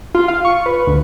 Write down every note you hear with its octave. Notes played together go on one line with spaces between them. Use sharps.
F4
F5
C#6
B4
D2